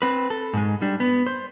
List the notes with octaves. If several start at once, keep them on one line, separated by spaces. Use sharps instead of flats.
C4 B4
A4
G#2 G#3
G3 D4
B3
C5